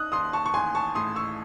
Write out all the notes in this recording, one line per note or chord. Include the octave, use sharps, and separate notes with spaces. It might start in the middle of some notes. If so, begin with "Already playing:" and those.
Already playing: D#4 D#6 F#6
D#2 C6 D#6
A5 C#6
C#6
A1 G#5 C6
A5 C#6
A2 C6 D#6
C#6 E6